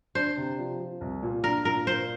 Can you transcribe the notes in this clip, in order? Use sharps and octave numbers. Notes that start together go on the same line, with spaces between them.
D4 C5
C3
F3
F3
C2
A#2
D4 A#4
A#2 A#4
A#3 C5